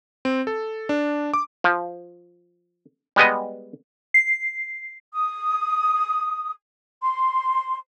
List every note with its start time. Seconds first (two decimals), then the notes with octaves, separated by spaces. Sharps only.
0.25 C4
0.47 A4
0.89 D4
1.34 D6
1.64 F3
3.16 G3 G#3 B3 D#5
4.14 C7
5.13 D#6
7.01 C6